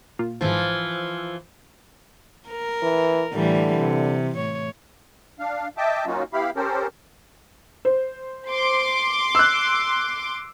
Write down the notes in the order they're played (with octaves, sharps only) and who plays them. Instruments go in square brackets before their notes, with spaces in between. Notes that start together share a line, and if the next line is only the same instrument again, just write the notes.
[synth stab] A#2 F4
[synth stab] G#1 G#2 [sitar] E3 F3
[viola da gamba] A#4
[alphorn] E3
[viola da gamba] A2 E3 G3 [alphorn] D3
[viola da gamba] C3
A2 C#5
[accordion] D4 F5
D#5 E5 G5 A5 D6
F#3 A#3 C#4 D#4 F4 F#4
B3 E4 G4 F5 B5
C#4 G4 A4 A#4 C5
[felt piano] C5
[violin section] C6 D6
[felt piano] E6 F#6